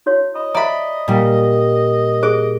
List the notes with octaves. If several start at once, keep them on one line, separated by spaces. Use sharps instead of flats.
E4 F#4 C#5
D#5 B5
C5 D5 E5 A#5 B5
A#2 G3
G#4 C5 D6